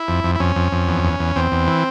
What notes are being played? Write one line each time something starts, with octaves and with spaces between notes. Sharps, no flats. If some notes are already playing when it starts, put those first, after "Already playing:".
Already playing: E4
F2
F2
E4
F2 C#4
F2
F2
E2
E2
E2
E2 C4
E2
E3